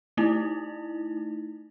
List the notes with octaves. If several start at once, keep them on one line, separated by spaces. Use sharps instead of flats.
A3 D#4 E4